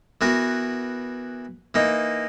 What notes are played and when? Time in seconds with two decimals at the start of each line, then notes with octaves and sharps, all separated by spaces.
0.21 E3 B3 F#4 A#4
1.74 E3 A#3 D#4